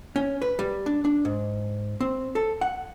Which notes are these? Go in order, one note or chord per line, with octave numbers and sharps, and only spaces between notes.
C#4
B4
G3
D4
D4
G#2
C4
A4
F#5